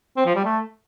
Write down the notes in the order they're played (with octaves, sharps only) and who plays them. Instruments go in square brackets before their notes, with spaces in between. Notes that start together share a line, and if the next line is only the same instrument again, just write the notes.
[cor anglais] C4
F3
G3
A3